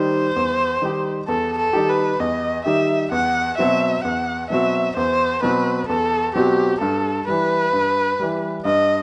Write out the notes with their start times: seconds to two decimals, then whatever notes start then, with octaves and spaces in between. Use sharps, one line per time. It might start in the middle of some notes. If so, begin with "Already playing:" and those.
Already playing: D#3 G3 D#4 G4 C5
0.36 E2
0.82 D#3 G3 D#4 G4
1.27 E2 A4
1.58 A4
1.73 D#3 G3 D#4 G4
1.89 B4
2.20 E2 D#5
2.66 D#3 G3 D#4 G4 E5
3.12 E2 F#5
3.58 B2 F#3 C4 F#4 E5
4.04 E2 F#5
4.50 B2 F#3 C4 F#4 E5
4.96 E2 C5
5.42 B2 F#3 C4 F#4 B4
5.88 E2 A4
6.35 B2 F#3 C4 F#4 G4
6.81 G2 A4
7.27 E3 G3 B4
7.73 G2
8.19 E3 G3
8.65 G2 D#5